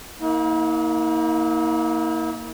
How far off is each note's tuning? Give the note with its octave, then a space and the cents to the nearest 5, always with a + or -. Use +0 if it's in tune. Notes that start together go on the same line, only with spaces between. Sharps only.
A#3 +0 E4 -45 F5 +45